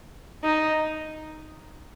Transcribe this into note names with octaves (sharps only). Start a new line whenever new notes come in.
D#4